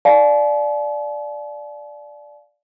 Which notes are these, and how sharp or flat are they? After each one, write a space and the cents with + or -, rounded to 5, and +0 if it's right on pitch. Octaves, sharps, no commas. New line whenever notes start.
D5 +0 F5 +0 A5 -45